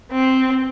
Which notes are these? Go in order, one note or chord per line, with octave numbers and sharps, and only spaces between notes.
C4